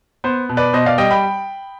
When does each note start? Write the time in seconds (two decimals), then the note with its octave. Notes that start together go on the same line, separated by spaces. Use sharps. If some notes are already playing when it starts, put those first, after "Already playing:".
0.24 B3 C5
0.49 B2
0.57 B4 D5
0.73 B2 C5 D#5
0.86 D5 F5
0.98 G3 D#5 G5
1.11 G5 B5